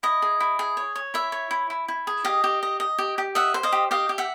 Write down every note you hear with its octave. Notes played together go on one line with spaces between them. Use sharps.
E4 D#5
G#4
E4
G#4
C#5
C#5
E4 E5
C#5
E4
E4
E4
G#4
G4 D#5 F5
G4
D#5
D#5
G4
G4
D#5 E5 F#5
C5
D#5 F5
G4
G4 D#5 F5
G4
E5 F#5